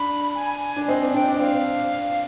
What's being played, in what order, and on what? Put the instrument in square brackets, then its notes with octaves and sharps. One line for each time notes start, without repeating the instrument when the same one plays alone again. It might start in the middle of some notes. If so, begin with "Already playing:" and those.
Already playing: [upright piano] D4 [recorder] B5
[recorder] G#5
[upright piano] D4
[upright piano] C4 [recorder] D#5
[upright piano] D4
[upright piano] D4 [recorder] G5
[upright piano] D4
[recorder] D#5
[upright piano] C4 [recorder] F5